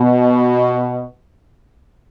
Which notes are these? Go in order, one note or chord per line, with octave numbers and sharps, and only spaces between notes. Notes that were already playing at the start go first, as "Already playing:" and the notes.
Already playing: B2